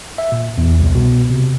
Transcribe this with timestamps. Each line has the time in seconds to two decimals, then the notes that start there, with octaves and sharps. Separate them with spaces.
0.18 E5
0.32 A#2
0.58 E2
0.79 C2
0.95 B2
1.30 C3